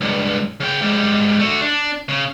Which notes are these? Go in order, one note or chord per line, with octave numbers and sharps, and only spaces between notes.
C#2 G2
C#3 G5
G#2 G3
A3 F#4
D4
C#3